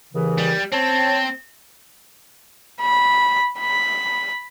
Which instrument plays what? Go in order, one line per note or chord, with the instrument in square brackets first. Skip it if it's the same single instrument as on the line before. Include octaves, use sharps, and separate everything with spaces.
[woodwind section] D#2 C#3 E3
[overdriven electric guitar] G3
[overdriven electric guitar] C4 [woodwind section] C#5 A5
[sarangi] B5
B5